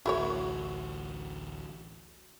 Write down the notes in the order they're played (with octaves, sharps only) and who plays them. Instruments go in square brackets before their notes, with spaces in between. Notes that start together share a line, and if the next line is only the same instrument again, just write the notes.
[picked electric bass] A1 D2 [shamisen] E4 A#4 C#5 [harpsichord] F#4